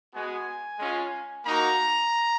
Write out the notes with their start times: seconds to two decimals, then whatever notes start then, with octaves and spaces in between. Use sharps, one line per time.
0.14 G#3 B3 F#4 G#5
0.79 G#3 C#4 F4
1.45 A#3 D#4 F#4 A#5